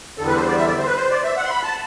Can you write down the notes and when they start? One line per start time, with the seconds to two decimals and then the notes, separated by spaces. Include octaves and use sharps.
0.18 E2 D3 G3 A4
0.27 B4
0.37 C5
0.47 D5
0.57 E5
0.67 D5
0.78 C5
0.87 B4
0.97 C5
1.10 D5
1.24 E5
1.37 F#5
1.45 C6
1.50 B5
1.63 A5